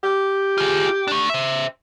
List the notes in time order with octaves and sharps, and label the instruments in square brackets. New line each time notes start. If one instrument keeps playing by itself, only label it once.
[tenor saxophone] G4
[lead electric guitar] F4 G#4
A3 D4
C5 E5